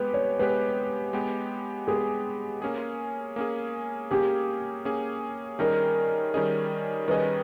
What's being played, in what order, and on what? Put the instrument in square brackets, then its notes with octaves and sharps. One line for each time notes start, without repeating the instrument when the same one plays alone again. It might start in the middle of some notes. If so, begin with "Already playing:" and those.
Already playing: [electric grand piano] G#3 B3 G4 [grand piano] B4
[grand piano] C#5
[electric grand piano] G#3 B3 G4 [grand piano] B4
[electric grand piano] G#3 B3 G4
[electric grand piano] G#3 B3 G4 [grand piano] G#4
[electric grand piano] A#3 C#4 G#4
A#3 C#4 G#4
[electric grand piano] A#3 C#4 G#4 [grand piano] G4
[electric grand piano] A#3 C#4 G#4
[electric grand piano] D#3 G3 C#4 G#4 D#5 [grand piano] A#4
[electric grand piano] D#3 G3 C#4 G#4 D#5
[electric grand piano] D#3 G3 C#4 G#4 D#5 [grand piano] B4